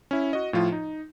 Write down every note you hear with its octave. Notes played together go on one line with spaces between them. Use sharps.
C#4 E4
F#4 D#5
A2 F3 F4
D#4